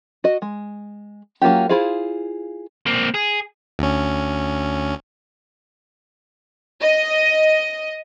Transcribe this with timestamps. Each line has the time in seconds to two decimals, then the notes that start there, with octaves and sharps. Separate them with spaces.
0.24 F#4 D#5
0.42 G#3
1.42 F#3 A#3 C#4 F4 G4
1.69 E4 F4 G#4 C5 F5
2.86 A#3 C4
3.14 G#4
3.79 D2 C#4
6.82 D#5